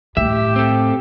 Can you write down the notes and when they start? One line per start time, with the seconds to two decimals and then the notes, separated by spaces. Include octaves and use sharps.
0.17 A2 G4 E5
0.56 C4 A4